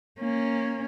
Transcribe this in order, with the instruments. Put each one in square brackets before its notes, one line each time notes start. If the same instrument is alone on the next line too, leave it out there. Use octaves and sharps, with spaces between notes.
[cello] A#3 C#4